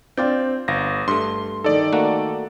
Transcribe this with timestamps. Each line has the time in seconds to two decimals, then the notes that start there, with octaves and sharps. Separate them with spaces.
0.17 C4 D4 F4 D5 G5
0.68 G1 F5 A#6
1.08 G2 A3 C6
1.64 D#3 D#4 A4 D5
1.93 A3 A#3 F#4